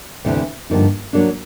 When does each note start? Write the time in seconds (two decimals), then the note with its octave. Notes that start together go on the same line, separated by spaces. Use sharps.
0.25 D2 C3 E3 A3
0.70 G2 D3 F3 A#3 D#4
1.13 F#3 A#3 D4